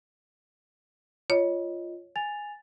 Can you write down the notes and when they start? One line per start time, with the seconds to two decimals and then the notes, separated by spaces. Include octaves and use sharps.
1.30 F4 C#5 D#5
2.16 G#5 A6 F7